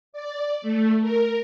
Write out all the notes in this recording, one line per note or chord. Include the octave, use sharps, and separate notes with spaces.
D5
A3
A#4